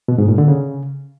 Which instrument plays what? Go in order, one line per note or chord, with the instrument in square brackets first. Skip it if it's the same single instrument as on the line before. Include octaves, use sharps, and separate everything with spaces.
[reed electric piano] B2
G#2
A#2
D3
C#3